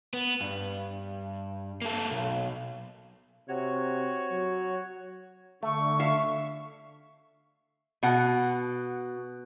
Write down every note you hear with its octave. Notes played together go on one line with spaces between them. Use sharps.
B3
G2
A#3 A4
B1
C3 F#4 C#5
F#3
D3 A3 C#6
E5 F5
B2 F#5